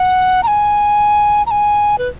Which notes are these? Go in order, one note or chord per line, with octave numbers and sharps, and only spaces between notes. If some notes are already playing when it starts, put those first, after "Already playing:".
Already playing: F#5
A#5
G#5
A#5
G#5
B4